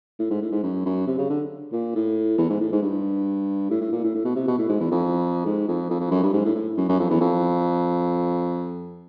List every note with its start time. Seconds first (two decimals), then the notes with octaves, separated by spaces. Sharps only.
0.19 A2
0.30 G#2
0.42 A2
0.52 G#2
0.63 F#2
0.85 F#2
1.07 C3
1.18 C#3
1.29 D3
1.72 A#2
1.95 A2
2.38 E2
2.50 G#2
2.60 A2
2.72 G#2
2.82 G2
3.70 A2
3.81 A2
3.92 A#2
4.03 A2
4.15 A2
4.25 B2
4.35 C3
4.47 B2
4.58 A2
4.68 G#2
4.80 E2
4.91 F2
5.46 G#2
5.68 F2
5.90 F2
6.00 F2
6.11 F#2
6.23 G2
6.33 G#2
6.45 A2
6.55 A2
6.77 F#2
6.89 F#2
6.99 F2
7.10 E2
7.20 F2